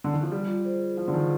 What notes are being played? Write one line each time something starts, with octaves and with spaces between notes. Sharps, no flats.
D3
D#3
F3
G3 F4
G#4 C5
F3 F4
D3
D#3